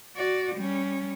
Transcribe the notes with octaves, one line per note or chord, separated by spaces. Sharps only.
F#4 D5
G3 C#4